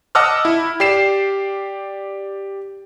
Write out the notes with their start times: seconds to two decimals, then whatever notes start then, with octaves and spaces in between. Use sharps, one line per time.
0.15 D#5 F#5 A5 D6 E6 F6
0.45 E4
0.80 G4 D5 C7 E7